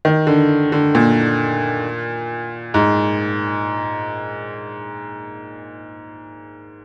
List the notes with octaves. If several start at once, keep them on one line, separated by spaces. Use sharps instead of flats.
D#3
D3
D3
A#2
G#2